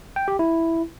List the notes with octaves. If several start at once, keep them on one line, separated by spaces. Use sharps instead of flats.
G5
G4
E4